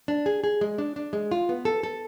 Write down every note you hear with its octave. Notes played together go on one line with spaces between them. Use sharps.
D4
G#4
G#4
G#3
D4
D4
G#3
F4
B3
A4
A4